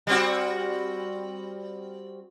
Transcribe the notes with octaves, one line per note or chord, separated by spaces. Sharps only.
G3 C4 F#4